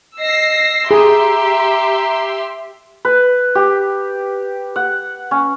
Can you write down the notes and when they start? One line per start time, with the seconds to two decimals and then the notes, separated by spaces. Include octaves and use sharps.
0.19 D#5 E6 A#6 C7
0.91 G4 G#4 E5 A#5 C6
3.05 B4
3.55 G4
4.76 F#5
5.31 C#4